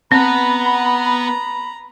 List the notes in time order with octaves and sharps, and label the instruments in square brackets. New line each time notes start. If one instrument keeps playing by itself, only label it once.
[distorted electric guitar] B3 F#5 [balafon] C4 [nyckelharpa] A#5 [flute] B5